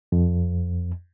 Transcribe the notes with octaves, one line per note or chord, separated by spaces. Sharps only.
F2